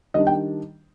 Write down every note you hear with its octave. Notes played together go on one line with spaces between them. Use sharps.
D#3 G3 D4 D#5
G5